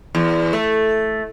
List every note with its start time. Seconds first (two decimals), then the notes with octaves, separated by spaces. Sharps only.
0.15 E2
0.53 A3